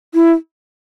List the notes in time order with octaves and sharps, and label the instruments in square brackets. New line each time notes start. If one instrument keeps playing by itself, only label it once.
[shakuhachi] E4